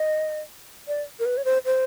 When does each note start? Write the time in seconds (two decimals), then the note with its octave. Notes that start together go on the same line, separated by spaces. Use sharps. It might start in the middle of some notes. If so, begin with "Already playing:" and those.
Already playing: D#5
0.88 D5
1.19 A#4
1.26 B4
1.37 C#5
1.45 C5
1.65 C5